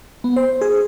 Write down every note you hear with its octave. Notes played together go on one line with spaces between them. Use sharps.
B3
C5
G#4